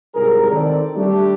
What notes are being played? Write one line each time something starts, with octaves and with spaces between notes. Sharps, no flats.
C2 G#2 F#3 G#4 A#4
D#3 C4 A4 D5
G3 A3 D4 G4